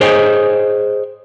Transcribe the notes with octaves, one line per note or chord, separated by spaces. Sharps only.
G#4 C5 C#5 D#5 G5 G#5